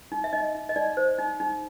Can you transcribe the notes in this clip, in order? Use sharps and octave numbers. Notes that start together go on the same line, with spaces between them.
D#4
E5
D#4 D#5
D#4
D#5
D#4 D5
C5
D#4
D#4